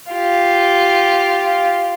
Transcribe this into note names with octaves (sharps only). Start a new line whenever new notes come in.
F4 G4